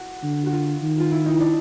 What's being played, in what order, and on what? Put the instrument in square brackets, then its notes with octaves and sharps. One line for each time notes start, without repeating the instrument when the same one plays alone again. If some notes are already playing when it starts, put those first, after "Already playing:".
Already playing: [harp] F#4
[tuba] D3
[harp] F#4
F4
[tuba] D#3
[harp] F4
E4
D#4
D4